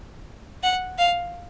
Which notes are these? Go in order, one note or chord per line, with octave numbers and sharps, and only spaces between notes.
F#5
F5